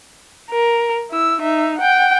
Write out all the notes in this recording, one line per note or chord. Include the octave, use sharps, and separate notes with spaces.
A#4
E4 E6
D#4 E5
F#5 G5